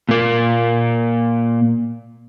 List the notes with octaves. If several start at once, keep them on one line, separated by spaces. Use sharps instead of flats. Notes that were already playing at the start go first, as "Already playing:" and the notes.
A#2 A#3